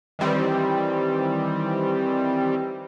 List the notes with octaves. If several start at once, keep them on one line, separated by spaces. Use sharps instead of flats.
D#3 E3 G3 C4